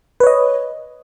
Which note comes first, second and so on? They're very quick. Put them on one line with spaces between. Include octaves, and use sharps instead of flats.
B4 C#5 D#5